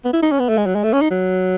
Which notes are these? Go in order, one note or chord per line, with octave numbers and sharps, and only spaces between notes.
B3
E4
D#4
C#4
B3
A3
G#3
F#3
G#3
A3
C#4
D#4
F#3